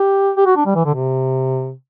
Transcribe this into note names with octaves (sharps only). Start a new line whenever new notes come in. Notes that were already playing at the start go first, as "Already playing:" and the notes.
Already playing: G4
G4
F#4
D4
G3
E3
D3
C3